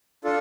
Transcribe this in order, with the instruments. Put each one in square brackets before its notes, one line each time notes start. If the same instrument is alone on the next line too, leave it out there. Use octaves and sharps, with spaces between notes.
[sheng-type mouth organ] D4 F4 A4